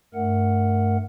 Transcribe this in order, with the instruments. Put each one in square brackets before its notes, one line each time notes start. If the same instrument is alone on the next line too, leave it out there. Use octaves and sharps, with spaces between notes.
[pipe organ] G2 A3 A#4 F#5